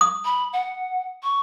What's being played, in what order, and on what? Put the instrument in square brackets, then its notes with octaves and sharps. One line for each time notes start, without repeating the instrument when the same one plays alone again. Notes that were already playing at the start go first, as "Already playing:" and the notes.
[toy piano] D#6
[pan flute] B5
F#5
C#6